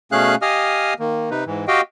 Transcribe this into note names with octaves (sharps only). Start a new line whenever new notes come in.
B2 A3 C#4 G#4 F5 F#6
G4 D#5 F5 G#5 D#6 F6
D#3 A#3
C3 D#4 B4
G#2 E3
F#4 G4 D#5 F5 G5